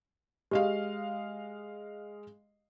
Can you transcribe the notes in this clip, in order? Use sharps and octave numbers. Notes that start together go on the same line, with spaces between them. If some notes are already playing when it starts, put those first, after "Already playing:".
G#3 G4 D#5 F5